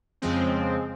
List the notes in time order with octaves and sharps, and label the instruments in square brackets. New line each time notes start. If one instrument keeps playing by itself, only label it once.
[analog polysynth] F2 C#3 F3 G#3 C4